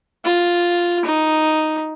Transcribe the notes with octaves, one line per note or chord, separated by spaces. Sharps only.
F4
D#4